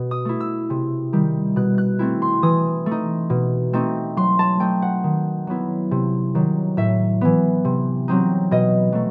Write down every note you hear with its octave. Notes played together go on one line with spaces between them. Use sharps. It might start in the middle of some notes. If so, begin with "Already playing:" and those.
Already playing: B2
D#6
A3 E4
E6
C3
D#3 G3
B2 F#6
F#6
A3 C4 E4
C6
E3 D#6
A3
D#4
B2
A3 C4 D#4
F#3 C6
A5
A3 D#4 G5
F#5
D#3
F#3 B3 E4
C3
D#3 F#3
A2 E5
E3 B3
C3
F#3 C4 D#4
B2 D#5
F#3 A3